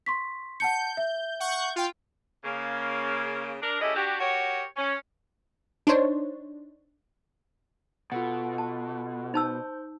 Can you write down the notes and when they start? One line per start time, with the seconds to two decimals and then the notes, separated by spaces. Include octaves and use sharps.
0.06 C6 C#6 B6
0.60 F#5 A5 G6 C#7
0.97 E5
1.40 F#5 C#6 G6
1.76 F4 G5
2.44 C#3 A#3
3.61 D4 A#4
3.80 G#3 C#4 E4 G4 A4 D#5
3.94 D4 F#4 G4
4.20 F#4 G4 A#4 C#5
4.77 C#4
5.87 D4 D#4 C5 C#5
8.12 B2 F4 A4 F#5
8.58 A5
9.34 D#4 C5 A5 E6 G6